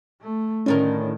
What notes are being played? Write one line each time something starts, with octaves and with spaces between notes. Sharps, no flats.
A3
D2 A2 D#3 C#4 A#4